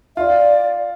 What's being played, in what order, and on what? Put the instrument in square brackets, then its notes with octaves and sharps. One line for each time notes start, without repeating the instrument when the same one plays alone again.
[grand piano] F4 [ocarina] D5 E5